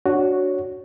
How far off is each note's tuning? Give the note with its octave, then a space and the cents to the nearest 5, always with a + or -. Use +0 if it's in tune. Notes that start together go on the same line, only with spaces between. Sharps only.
D4 +0 F#4 +0 C#5 +0